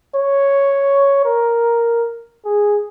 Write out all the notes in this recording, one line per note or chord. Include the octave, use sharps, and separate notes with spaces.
C#5
A#4
G#4